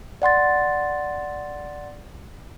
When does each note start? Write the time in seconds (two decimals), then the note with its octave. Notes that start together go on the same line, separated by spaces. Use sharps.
0.22 D5 F#5 C6 A6